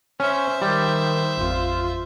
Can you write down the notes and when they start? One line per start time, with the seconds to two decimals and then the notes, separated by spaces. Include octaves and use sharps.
0.20 C#4 C5 E5
0.62 D#3 G3
1.38 A1 F2 F4